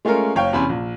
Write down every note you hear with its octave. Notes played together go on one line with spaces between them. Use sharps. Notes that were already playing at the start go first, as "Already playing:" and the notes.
G#3 A3 C#4 F4 A#4
F#1 C#5 F5 G5
E2 C3 C#4 B5 C6
A#1